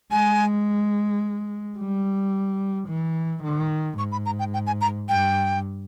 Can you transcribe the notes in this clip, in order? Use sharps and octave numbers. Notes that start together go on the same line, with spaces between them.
G#3 G#5
G3
E3
D#3
G#2 C#6
B5
A#5
G5
G5
G#5
A#5
G2 G5